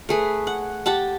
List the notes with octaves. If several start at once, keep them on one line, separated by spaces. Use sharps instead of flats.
A3 G#4 B4
F#5
G4 F#5 A5